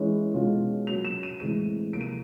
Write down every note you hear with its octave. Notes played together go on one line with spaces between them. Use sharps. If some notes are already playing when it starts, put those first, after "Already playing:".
Already playing: E3 G#3 C#4
B2 G#3 C#4 F4
F#3 A#3 C#4 F7
E7
D#7
A2 E3 G#3 C4 D#7
C3 F3 A#3 D7
D#7